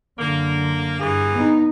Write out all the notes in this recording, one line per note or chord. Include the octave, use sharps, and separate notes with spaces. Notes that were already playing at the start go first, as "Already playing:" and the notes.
F#2 D3 A#3
G2 E3 A#3 G#4
B3 D#4